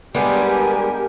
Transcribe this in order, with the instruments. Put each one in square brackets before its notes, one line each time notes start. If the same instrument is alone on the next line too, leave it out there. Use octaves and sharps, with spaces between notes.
[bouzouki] G3 G#3 D4 [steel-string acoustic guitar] B3 [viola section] G4 A#4 [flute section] G#5